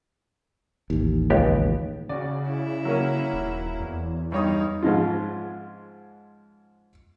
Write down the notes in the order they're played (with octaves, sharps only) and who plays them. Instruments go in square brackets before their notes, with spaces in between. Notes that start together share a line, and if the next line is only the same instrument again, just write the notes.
[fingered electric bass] A1 D#2
[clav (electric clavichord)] C#2 B3 G4
[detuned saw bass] C#3 [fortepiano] F#4 D5
[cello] E4
[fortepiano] F#3 A#3 C#4
[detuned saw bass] D#1
E2
[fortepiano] G2 C#5 D#6 [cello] G3 D#4
[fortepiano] G#2 F3 G#3 C#4 F4